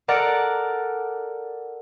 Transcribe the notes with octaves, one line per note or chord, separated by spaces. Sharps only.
A4 A#4 D5 F#5